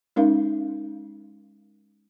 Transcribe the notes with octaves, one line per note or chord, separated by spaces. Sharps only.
G#3 C#4 D#4 A#4 F5